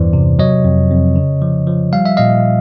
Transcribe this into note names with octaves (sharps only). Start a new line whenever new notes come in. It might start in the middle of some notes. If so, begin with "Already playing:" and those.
Already playing: E2 G2 E3 C5 D5
C3
F#3 C#5 D#5
F2
F2
C#3
F3
F3
G3 F5
E5
A#2 D#5 F5